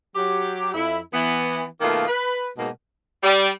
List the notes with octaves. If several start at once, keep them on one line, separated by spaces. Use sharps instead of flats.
F#3 G4
F2 E4
E3 B3
B2 D#3 A3 A#3 F4 D#5
B4
G#2 B2 A#3
G3